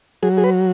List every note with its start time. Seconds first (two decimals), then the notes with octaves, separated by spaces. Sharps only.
0.23 F#3 G#4
0.37 G#4
0.44 B4